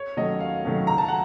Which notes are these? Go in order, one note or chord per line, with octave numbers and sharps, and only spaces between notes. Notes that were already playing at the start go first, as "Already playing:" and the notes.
Already playing: C#5
D#3 F#3 A3 C#4 D#5
D#2 F5
D#3 F#3 A3 C#4
C#2 A#5
A5
F#5